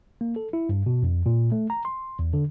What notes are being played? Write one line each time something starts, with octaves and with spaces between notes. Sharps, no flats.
A#3
A4
E4
G2
B2
F2
A#2
A3
A#5
C6
E2
D3